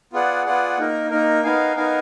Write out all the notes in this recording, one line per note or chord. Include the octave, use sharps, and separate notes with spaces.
B3 F4 G#4 D5 F#5
B3 F4 G#4 D5 F#5
A#3 D#4 A#4
A#3 D#4 A#4
B3 D#4 A#4 F5 G#5
B3 D#4 A#4 F5 G#5